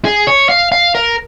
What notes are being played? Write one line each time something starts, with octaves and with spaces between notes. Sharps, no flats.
G#4
C#5
F5
F5
A#4